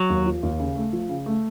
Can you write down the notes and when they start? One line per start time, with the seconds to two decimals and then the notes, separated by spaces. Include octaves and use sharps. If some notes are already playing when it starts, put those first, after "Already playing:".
Already playing: F#3
0.10 D#2
0.26 F3
0.43 D#2
0.60 C#3
0.76 A3
0.93 F3
1.09 C#3
1.26 A3